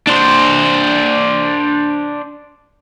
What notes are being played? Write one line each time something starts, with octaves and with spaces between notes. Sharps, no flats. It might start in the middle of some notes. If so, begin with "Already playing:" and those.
D4 C5